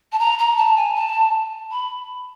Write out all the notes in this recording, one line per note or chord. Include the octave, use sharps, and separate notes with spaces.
A5
A#5
A#5
A5
G#5
A5
B5